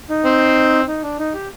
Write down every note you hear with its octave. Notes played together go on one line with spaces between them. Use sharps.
D#4
C4
D#4
D4
D#4
G4